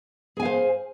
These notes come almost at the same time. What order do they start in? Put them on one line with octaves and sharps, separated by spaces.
G#4 G#5 F5 C5